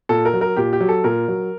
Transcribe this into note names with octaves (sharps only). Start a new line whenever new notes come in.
A#2 A4
A#4
F#3
A#4
A#2 G4
G4
F#3
A4
A#2 A#4
F#3